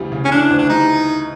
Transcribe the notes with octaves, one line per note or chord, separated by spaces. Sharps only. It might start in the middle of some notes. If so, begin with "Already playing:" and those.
Already playing: D2 C#3 E3 G3
C#3
C#4
E3 D4
D2
D4
G3 D#4